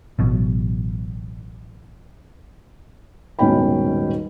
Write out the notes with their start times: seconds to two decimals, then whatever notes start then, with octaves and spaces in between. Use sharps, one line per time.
0.19 A1 B2 F#3
3.39 D#1 G#2 B2 C#4 G5 B5